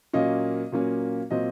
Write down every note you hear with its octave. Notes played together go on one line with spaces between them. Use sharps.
A#2 F#3 A#3 C#4 D#5
A#2 F#3 A#3 C#4
A#2 F#3 C4 D#5